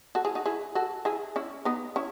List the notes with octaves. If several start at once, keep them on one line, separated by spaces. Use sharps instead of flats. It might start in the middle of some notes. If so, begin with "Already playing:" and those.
F#4 A4
E4 G#4
D#4 F#4
E4 G#4
F#4 A4
E4 G#4
C#4 E4
B3 D#4
C#4 E4